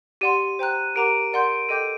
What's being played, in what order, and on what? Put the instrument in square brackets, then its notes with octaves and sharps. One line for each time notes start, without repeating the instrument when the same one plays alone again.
[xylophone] G4 D5 F#5 C6 [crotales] D#7
[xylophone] C5 G5 A#5 F#6
[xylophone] G4 A#4 F#5 A#5 D6 [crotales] D7
[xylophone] A#4 D5 F#5 C6 G6
[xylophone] A4 D#5 G5 D6 G6 [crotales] D#7